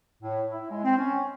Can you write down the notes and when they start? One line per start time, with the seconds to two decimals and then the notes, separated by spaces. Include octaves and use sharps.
0.23 A2
0.51 E4
0.70 G#3
0.84 C4
0.98 C#4